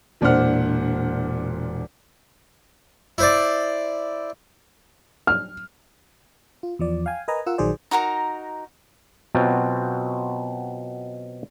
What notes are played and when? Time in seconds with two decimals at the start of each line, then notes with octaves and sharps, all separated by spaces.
0.21 E1 A#2 D4 C5 F#5 F6
3.18 E4 C5 D5
5.27 F6
6.63 F4
6.79 E2 F3 D5
7.06 F5 G5 G#5
7.28 A#4 B4 D#5 G#5 A#5
7.46 F4 A#4 F#5 E6
7.58 A#1 D#3 F#3 G#4 C5 D5
7.91 D#4 F#4 A#4 A#5
9.35 B2 F#3 C4 F4